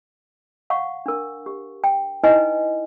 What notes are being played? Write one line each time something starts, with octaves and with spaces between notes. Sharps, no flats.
F5 F#5 C#6
D4 A#4
G4
G5
D#4 E4 B4 D#5 G#5